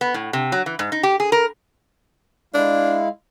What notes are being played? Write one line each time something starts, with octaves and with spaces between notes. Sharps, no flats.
B3
A2
C3
F#3
E3
G#2
D#4
G4
G#4
A#4
G#3 D4 E4 F5